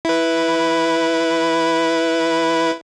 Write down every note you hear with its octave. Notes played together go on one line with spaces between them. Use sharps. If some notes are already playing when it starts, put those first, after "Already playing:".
E4 B4